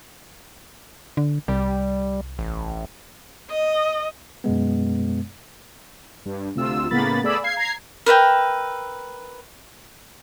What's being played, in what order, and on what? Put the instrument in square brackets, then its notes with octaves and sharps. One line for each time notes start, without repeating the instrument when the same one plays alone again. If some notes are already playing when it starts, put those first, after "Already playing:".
[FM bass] D3
[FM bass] C2 [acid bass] G3
[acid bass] A1
[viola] D#5
[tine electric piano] F#2 B2 G#3 B3
[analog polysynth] G2
D2 C3 F4 E6
A2 C#3 A#3 B3 B5 A6
A3 B3 G#4 D5 B5 E6
F5 G#6 C7
A#5 G#6 C7
[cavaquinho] A#4 B4 E5 G5